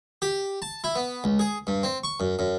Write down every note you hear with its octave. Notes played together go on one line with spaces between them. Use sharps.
G4
A5
E4
B3
C#2
G#4
G2
C4
C#6
F#2
F#2